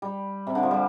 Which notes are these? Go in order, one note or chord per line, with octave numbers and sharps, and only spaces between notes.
G3
C3
D3
F3
G3